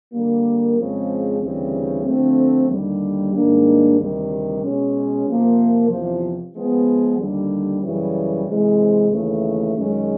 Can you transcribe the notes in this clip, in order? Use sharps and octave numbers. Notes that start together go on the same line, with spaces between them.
D3 G3 A#3
F2 C#3 F3 G#3 C4
D2 C#3 E3 G3 C4
D3 F3 A3 C4
D#2 D3 G3
G#2 D#3 G3 A#3 D4
D2 C3 D#3 G3
B2 G#3 C#4
C3 F3 A#3
E2 C3 F3
F3 G#3 B3
D#2 D3 G3
F#2 C#3 E3 G3
C3 E3 G#3 C4
D#2 C#3 E3 A3
F#2 D#3 G#3 C#4